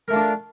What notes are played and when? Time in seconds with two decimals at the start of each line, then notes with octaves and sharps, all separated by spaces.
0.08 A#4
0.11 A3
0.13 F4
0.16 D4